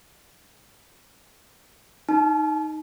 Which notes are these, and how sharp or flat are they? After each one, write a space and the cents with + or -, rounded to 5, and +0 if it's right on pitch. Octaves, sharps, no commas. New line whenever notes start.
D#4 +0 A5 -45